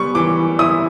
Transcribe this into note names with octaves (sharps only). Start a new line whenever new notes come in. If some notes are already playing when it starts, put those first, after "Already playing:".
Already playing: G3 B3 C#6
E3 D6
E4 D#6